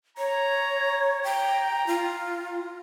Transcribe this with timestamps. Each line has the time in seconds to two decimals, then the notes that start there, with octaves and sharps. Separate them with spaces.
0.18 C#5 A#5
1.24 G5 A#5
1.87 F4